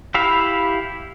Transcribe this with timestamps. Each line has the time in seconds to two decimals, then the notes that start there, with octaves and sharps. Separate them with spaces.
0.14 E4 G4 E5 F5 B5